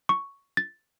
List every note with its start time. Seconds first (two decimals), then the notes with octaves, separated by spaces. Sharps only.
0.09 C#6
0.57 A6